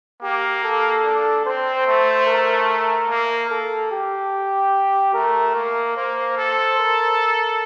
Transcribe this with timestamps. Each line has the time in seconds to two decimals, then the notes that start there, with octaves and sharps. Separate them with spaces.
0.23 A#3 G4
0.64 A4
1.04 D4
1.46 C4 C5
1.87 A3
2.27 A#4
3.09 A#3
3.50 A4
3.91 G4
5.14 A3 A#4
5.55 A#3 A#4
5.96 A#3 C5
6.37 A4
6.78 A#4